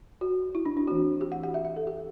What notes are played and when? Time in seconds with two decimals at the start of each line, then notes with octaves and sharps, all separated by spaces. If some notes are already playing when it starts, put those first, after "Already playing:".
0.21 F#4
0.55 E4
0.66 D4
0.77 D4
0.87 E3 A3 C4 F#4
1.21 G4
1.32 F#5
1.43 F#5
1.54 E5
1.65 E5
1.76 A4
1.87 G4